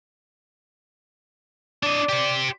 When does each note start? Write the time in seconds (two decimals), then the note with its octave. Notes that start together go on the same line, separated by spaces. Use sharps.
1.83 D4 D5 D#5
2.09 G4 C5